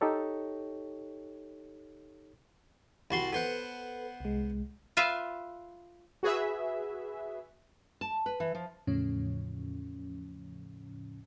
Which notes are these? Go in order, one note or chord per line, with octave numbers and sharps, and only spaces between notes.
D#4 G4 A4 C#5
C2 F#4 B5 C6 A6
B3 A4 B4 C5 F#5
C2 G#3
F4 B4 E5 F5
F#4 G#4 B4 E5
A5
B4
E3
F3
E2 A2 C#3 F3 C#4